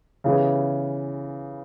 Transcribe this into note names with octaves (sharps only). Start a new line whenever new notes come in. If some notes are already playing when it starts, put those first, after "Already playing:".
C#3 E3 B3